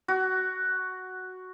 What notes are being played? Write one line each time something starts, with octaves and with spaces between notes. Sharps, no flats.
F#4